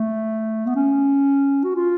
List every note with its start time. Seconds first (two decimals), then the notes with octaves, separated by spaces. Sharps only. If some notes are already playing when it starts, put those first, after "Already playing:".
Already playing: A3
0.66 B3
0.76 C#4
1.64 F#4
1.75 F4